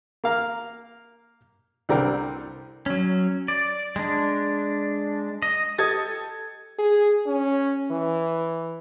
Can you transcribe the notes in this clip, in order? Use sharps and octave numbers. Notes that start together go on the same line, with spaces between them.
A#3 F5 A#5
C2 D3 G3 C4 A#4 G5
F#3 C#4
D5
G#3 D4
D#5
G4 A4 D#5 D#6 G#6 A6
G#4
C#4
E3